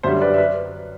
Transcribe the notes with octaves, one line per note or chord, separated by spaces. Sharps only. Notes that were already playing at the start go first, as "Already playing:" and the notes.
F#2 D3 G3 C5 E5
B4 D5
E5
B4